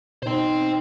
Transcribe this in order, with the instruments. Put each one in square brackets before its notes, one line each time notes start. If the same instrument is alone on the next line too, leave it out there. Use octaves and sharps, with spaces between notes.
[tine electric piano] B2 D#4 [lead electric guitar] C5 G5